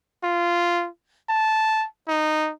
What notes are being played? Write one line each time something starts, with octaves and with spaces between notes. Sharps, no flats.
F4
A5
D#4